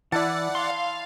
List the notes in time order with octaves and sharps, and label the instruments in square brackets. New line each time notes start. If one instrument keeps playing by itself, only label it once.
[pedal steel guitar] E3 [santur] E4 A5 [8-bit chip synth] D5 F#5
[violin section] F5 [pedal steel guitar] C6